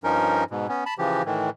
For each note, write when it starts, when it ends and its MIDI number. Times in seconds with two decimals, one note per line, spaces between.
0.04 0.44 43
0.04 0.44 53
0.04 0.44 61
0.04 0.44 63
0.04 0.44 70
0.51 0.67 44
0.51 0.67 47
0.69 0.84 59
0.69 0.84 61
0.86 0.94 81
0.86 0.94 83
0.98 1.23 49
0.98 1.23 52
0.98 1.23 53
0.98 1.23 67
1.26 1.50 45
1.26 1.50 51
1.26 1.50 52